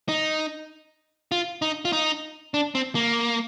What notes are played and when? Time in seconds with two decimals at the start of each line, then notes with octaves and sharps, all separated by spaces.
0.09 D#4
1.32 F4
1.62 D#4
1.85 F4
1.93 D#4
2.54 D4
2.75 C4
2.95 A#3